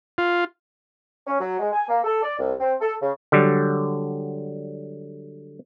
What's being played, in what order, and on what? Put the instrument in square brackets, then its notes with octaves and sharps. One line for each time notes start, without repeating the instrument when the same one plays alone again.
[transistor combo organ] F4
[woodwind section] C#4
F#3
G#3
G#5
A#3
A4
D5
C2
C4
A4
C#3
[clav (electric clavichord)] D3 F#3 G3